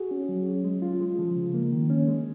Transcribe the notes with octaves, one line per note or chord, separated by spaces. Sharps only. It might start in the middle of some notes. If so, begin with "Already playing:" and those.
Already playing: F#4 G#4
C#4
F#3
C#4
G#3
F4
G#3
F3
C#3
A#3
D#3
C#4
G#3